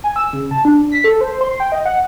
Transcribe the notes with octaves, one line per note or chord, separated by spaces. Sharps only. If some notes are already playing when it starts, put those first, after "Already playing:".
G#5
E6
C#3
A5
D4
B6
A4
C5
C6
G5
D#5
F#5